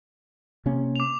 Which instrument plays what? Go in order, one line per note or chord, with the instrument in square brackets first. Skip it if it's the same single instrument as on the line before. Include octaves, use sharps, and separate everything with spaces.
[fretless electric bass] C3 A#3 C#4
[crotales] D6 F7